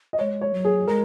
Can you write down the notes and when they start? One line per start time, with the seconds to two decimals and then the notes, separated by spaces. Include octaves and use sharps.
0.13 D#5
0.19 G#3 C#5
0.41 C#5
0.54 F#3
0.65 G#4
0.88 G#3 A#4